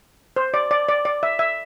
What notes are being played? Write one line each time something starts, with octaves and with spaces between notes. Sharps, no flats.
C5
D5
D5
D5
D5
E5
E5